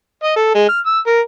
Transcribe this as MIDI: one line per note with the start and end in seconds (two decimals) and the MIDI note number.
0.23 0.34 75
0.36 0.54 69
0.54 0.64 56
0.69 0.80 89
0.86 0.99 88
1.07 1.20 70